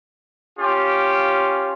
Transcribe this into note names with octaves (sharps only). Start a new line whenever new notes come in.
C#4 F4 G4